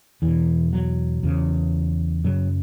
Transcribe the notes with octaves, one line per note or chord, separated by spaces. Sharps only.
E2 B2 E3
F#3
E2 C#3
F#2 C#3 F#3